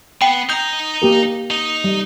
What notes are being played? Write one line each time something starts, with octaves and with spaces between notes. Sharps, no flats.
B3 G5
D#4 A#5 G6
A#3 G4 A#4
D#4
G3